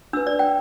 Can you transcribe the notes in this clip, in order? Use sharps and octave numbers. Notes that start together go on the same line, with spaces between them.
D4 B4 E6
D5
G5